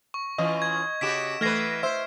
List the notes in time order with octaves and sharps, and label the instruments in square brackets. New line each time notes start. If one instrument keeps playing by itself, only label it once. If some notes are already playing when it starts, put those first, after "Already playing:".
[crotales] C#6
[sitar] E3 C#4 F4 [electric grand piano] D#5
[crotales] G#6
[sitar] C#3 F#4 G4 [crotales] B6 D7 E7
[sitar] E3 B4 [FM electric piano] A3 A#6 [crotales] F6 G#6 C7
[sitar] C5 [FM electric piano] E5